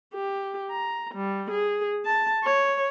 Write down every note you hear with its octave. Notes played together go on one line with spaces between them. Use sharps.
G4
A#5
G3
G#4
A5
C#5